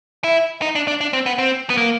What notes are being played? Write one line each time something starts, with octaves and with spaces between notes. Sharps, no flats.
E4
D#4
D4
D4
D4
C4
B3
C4
B3
A#3